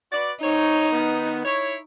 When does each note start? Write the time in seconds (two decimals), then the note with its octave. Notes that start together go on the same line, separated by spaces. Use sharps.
0.12 F#4 B4 D5
0.44 G#2 C4 D#4 C#5
0.93 D#3 B3
1.45 E4 C#5